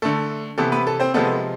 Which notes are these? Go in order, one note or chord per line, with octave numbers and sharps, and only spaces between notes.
D3 A3 A4
C3 E3 B3 A4
B3 B4
A4
C4 C5
C3 F3 G#3 B3 A4